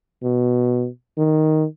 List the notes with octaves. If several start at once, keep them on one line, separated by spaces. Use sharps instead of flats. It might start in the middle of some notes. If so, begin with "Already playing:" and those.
B2
D#3